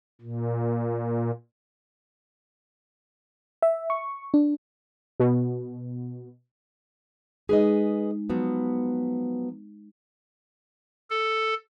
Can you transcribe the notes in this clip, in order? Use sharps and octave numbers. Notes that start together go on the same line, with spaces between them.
A#2
E5
C#6
D4
B2
G#3 D#4 G#4 B4 D#5
F3 F#3 B3
A4